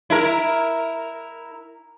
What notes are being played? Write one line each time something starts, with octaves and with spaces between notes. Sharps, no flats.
E4 A#4